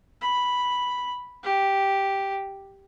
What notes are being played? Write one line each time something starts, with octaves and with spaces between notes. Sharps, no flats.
B5
G4